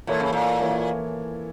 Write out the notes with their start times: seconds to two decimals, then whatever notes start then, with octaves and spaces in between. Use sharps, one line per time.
0.07 A#2 E3 A#3 E4 A4 C#5
0.20 C#3
0.33 A#2
0.61 E3 A#3 E4 A4 C#5